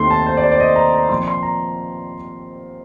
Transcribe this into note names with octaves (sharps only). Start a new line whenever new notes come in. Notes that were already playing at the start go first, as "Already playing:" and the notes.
Already playing: D#2 D#3 A3 C4 C6
A5
C5
D5
C5
D5
D#5
A#5
A#5
A#2 F3 C4 C6
C6
A#5